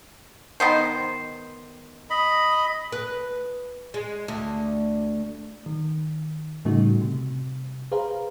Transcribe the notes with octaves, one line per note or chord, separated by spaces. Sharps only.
D#3 B3 C5
D#5 B5
B4
G#3
D2
D#3
A2 C#3 G3 A3 D#4 F#4
C3
G#4 B4 C5 F5 A#5